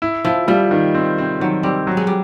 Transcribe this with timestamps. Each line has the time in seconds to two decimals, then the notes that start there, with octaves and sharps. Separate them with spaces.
0.02 E4
0.25 F3 E4
0.48 F3 G3
0.71 D#3
0.94 C4
1.18 C4
1.40 D#3 F#3
1.63 G3 C4
1.87 F#3
1.97 G#3
2.07 G3